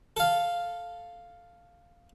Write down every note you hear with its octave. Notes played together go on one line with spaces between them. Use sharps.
A4 F5